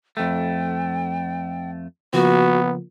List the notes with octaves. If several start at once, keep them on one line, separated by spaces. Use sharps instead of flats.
F2 A3 G5
C#3 F3 A#3 B3 F#4